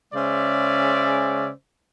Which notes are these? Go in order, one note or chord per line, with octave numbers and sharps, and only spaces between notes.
C#3 G#3 C#4 C5 D5 E5